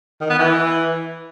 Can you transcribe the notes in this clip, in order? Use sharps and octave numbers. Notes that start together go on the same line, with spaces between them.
D#3
B3
E3